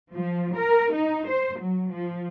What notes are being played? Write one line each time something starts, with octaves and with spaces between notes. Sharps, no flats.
F3
A#4
D#4
C5
F#3
F3